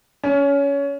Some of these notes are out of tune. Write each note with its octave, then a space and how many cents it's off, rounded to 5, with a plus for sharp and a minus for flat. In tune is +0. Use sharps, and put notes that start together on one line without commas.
C#4 +20